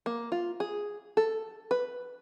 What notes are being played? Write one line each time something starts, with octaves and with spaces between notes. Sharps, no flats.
A#3
F4
G#4
A4
B4